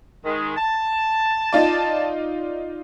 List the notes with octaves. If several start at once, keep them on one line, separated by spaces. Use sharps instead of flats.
D#3 G#3
A5
D#4 F4 D5